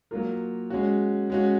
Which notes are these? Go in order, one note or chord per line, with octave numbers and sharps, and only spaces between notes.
F#3 A#3 F4 A#4
G#3 C#4 F#4
G#3 C#4 F#4